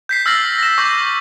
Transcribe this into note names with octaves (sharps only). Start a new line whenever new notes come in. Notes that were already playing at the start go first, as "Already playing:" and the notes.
G6 B6 C7
E6 F6 A6 A#6 C7 F#7
A#6 E7
C#6 D6 E6 G6